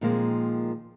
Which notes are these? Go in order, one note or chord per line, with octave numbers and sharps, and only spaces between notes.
A#2 D#3 F3 G#3 A#3 C4